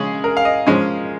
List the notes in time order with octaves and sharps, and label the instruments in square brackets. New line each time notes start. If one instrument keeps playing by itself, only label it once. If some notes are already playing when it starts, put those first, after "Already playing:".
Already playing: [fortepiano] C#3 G#3 C#4 [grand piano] G#4
[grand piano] A#4
F5
D#5
[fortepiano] F3 G#3 C#4